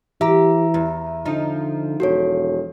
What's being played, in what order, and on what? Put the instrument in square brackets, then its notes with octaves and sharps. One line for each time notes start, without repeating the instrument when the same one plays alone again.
[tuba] E3 [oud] G4 [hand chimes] E5 A#5
[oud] E2
[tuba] D3 [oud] F3 D#4
[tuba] E1 [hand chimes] F#4 A4 C#5